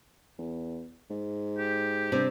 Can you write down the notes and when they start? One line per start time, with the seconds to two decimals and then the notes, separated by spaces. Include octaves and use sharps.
0.38 E2
1.10 G#2
1.58 G4
2.12 G2 C3